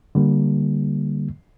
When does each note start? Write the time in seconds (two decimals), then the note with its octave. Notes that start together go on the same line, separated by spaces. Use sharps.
0.15 D3 G3 A#3